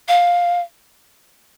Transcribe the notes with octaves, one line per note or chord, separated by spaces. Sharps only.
F5